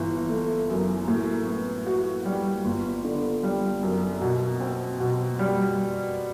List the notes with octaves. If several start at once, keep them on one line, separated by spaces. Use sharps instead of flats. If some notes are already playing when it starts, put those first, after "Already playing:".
Already playing: G1 E3
A3
F#2
A2
B3
F#4
G3
G1
D3
G3
F#2
B2
C4
B2
G3